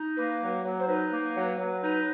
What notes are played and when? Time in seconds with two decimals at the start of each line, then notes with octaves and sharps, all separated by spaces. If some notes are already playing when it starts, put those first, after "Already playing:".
Already playing: D#4
0.17 A#3 B4
0.41 F#3
0.64 F#3
0.79 C5
0.88 D#4 B4
1.12 A#3
1.35 F#3
1.58 F#3
1.82 D#4